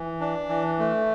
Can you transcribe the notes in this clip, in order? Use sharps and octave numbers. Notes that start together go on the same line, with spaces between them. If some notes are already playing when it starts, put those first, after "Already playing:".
Already playing: E3
D4
E3
A3